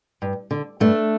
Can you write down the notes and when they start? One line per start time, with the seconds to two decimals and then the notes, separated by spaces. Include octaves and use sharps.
0.22 G2
0.51 D3
0.80 G2 A3 D4